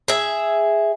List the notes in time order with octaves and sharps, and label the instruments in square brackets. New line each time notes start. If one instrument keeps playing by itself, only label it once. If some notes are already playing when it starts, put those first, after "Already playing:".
[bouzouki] G#4 E5